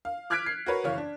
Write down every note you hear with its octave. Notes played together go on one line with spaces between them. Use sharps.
F5
D6 F6 F#6 G#6 B6 D7
C7
F#4 A#4 B4 C#5
F#1 E3 C#5 F5
D4